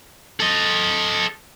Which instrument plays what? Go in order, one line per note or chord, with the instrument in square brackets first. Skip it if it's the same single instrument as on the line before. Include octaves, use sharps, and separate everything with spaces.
[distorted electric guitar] A4 D#5